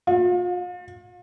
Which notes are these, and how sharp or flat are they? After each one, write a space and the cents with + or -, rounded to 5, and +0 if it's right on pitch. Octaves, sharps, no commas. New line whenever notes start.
F4 +40